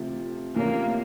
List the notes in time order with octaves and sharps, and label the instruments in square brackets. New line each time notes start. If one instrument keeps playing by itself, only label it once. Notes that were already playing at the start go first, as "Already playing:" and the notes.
Already playing: [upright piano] C3 F3 A3
[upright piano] C3 F3 A3 C#4 [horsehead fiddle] A#3